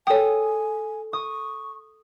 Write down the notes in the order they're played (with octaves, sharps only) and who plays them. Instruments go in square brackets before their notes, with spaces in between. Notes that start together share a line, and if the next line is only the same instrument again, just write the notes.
[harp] A4 D#6 [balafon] C#5 G5 [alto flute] G#5
[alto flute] C#6 [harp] D#6